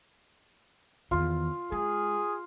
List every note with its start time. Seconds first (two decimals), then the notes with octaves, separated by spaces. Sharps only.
1.11 E2 D#3 F4
1.72 G#3 G#4